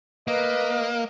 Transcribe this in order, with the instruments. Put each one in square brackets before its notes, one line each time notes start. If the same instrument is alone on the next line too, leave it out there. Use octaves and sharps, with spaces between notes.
[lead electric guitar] A#3 [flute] B4 [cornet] D#5